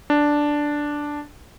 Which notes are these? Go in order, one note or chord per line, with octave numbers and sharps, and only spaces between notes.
D4